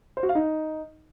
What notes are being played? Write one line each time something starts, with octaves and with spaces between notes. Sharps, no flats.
C5
F#4
F5
D#4